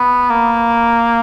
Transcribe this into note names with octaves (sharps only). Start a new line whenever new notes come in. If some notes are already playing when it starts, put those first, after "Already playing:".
Already playing: B3
A#3